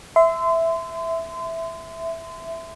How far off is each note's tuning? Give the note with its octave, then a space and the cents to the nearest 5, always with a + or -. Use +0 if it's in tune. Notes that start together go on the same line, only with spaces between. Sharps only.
E5 +0 C6 -30